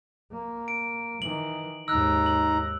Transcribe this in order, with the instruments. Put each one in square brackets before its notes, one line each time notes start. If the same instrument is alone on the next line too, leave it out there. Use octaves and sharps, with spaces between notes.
[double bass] A#3
[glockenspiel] D7
[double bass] D#3 E3 [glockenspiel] F#7
[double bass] D#2 G#2 [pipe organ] D#4 A#5 [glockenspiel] E6 F#6
[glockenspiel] F#7